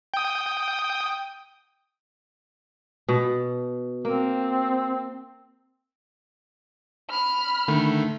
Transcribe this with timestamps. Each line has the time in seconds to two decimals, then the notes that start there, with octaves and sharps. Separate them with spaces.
0.14 G5 D#6
3.09 B2
4.05 A#3 C4
7.09 B5 F6
7.68 D3 D#3 A3